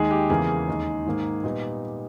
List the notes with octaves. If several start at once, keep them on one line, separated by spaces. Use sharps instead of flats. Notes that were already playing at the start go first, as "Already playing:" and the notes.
Already playing: D#2 D#3 G#3 G#4
G4
E2 C#3 E3 A#3 C#4 G#4
D#2 D#3 G#3
G#2 D#3 A#3 D#4
A#2 G3 B3 D#4